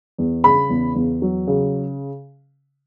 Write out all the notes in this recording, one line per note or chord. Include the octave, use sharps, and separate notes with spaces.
E2
C#3 B5
E2
E2
F#3
C#3